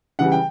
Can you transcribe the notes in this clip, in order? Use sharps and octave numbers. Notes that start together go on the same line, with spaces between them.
C#3 E3 G3 F#5
G5